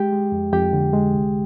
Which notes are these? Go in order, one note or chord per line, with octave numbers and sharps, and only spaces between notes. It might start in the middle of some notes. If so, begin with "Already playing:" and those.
Already playing: G#3 G4 G5
G#3
F2
F2 G4 G5
D3
G#3
C2